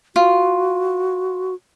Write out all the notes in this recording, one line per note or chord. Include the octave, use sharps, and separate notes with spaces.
F4 F#4